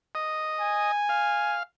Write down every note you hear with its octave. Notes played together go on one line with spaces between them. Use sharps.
D#5
G#5
F5